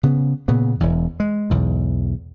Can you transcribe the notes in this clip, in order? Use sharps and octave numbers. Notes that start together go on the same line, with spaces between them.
C#3 B3
A#2 C#3 B3
E1 E2
G#3
B1 E2 G#2